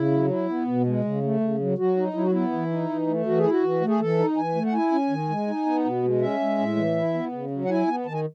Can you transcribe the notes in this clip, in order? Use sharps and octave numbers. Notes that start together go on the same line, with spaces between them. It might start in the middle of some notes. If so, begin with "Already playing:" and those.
Already playing: C#3 E4
F#3
E4
B3
B2
G#3
C#3
A3
C#3
F#3
F#3 F#4
D#4
F#3 E4
F#4
B3 E4
E3
D#4
E3
A3
E3 F#4
G#4
E4
F#4
E3
A3
G#4
E3 A4
D#4
E3 G#5
A3
F#5
E4 G#5
C#4
D#3
G#3
D#4
B3
B2
G#3
C#4 E5
G#3
A2
E3
E4
B3
C#3
F#3
F#5
E4 G#5
B3
D#3 A5
G#5